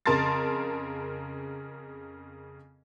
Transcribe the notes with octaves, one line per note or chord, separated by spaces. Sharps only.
F2 C#3 A#4 A5 C6 A6